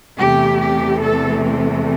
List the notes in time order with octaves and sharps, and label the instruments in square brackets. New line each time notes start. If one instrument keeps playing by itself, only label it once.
[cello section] E2 C3 E3 A3 G4
G4
A4
C4